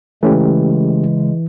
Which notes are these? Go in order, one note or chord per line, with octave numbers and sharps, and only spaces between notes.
C#3 E3 G#3 A3 C#4 G4